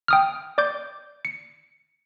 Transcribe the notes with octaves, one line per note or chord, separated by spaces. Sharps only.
G5 D#6 F6
D5 D6 G6
C#7